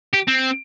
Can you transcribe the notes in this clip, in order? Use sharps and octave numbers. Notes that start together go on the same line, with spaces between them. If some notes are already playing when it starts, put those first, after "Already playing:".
G4
C4